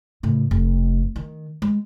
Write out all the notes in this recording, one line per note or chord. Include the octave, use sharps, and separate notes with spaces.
A2 C#3
F1
D#3
G#3